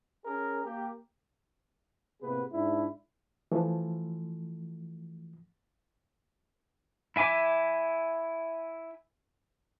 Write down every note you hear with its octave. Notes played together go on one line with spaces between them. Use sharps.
C#4 G#4 A#4
A#3 G4
A2 C3 A#3 B3 G#4 B4
G#2 D4 E4
E3 F3 A3
E4 E5 G#5 D6